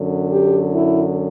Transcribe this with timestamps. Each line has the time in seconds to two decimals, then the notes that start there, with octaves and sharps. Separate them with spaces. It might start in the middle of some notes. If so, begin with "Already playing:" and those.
Already playing: F#2 D3
0.31 G4
0.72 E4